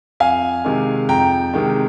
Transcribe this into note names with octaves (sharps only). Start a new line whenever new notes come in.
F2 F5 G#5
C3 D#3 G#3
F2 G5 A#5
C3 D#3 G#3